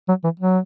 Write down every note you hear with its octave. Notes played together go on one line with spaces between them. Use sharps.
F#3
E3
F#3